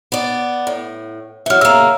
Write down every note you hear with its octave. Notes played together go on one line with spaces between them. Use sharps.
B3 D5
A2
E3 F#3 E5 F6
C#3 A#3 E6